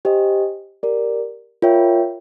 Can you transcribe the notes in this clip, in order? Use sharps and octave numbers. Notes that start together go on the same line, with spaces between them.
G4 C5 D#5 G#5
G4 A#4 D5
F4 A#4 C#5 E5 G5